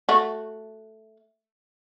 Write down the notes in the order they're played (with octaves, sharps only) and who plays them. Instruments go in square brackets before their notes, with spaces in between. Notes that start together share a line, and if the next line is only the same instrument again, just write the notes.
[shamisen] A3 F#4